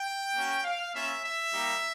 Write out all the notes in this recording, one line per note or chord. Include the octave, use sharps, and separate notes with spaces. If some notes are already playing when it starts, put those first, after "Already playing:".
Already playing: G5
A#3 C#4 F#4
F5
A#3 C#4 F4 E5
E5
G3 A#3 D#4 G4